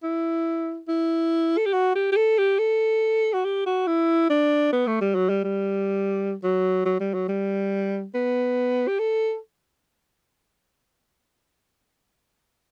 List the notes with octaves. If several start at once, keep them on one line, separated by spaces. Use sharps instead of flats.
E4
E4
A4
G4
F#4
G4
G4
A4
G4
A4
F#4
G4
F#4
E4
D4
B3
A3
G3
F#3
G3
G3
F#3
F#3
G3
F#3
G3
B3
G4
A4